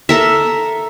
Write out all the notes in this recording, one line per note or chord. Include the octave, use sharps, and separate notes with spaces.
A4 A#4 E5